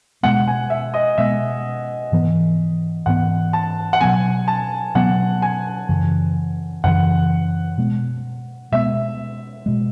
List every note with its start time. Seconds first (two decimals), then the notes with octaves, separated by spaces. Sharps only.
0.23 B2 G#3 B3 F#5
0.48 G#5
0.70 E5
0.94 D#5
1.18 B2 G#3 B3 E5
2.12 G#2 E3 B3
3.06 G#2 E3 B3 F#5
3.53 A5
3.93 F#5
4.01 B2 F#3 B3 G#5
4.48 A5
4.95 B2 F#3 B3 F#5
5.42 G#5
5.89 F#2 C#3 E3
6.84 F#2 C#3 E3 F#5
7.78 B2 G#3 B3
8.72 B2 G#3 B3 E5
9.66 B2 G#3